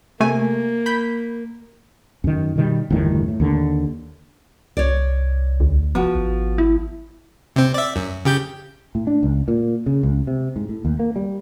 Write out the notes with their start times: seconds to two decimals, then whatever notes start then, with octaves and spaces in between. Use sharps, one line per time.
0.20 C3 A3 A#3 G#5
0.86 B5 G6 B6
2.24 F#2 D#3
2.56 B2 D#3 G3
2.90 G1 E2 A2 D#3
3.28 A2
3.40 D#2 D3
4.77 C2 C#5 D5
5.60 D2
5.95 F1 F3 B3 F#4
6.15 G#1
6.58 E4
7.56 C3 C4
7.74 D5 E5
7.96 F#2
8.25 C#3 G4 G6
8.95 A2
9.07 D4
9.23 C#2
9.48 A#2
9.86 C#3
10.03 C#2
10.27 C3
10.56 G#2
10.69 A2
10.85 D#2
10.99 A#3
11.16 G3